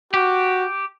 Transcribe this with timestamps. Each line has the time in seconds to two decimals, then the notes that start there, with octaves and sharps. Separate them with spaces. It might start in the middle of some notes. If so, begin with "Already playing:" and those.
0.14 F#4 G4